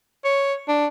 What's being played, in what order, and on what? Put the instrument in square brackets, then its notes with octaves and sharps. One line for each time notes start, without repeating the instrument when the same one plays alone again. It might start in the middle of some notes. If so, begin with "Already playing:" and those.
[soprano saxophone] C#5
D4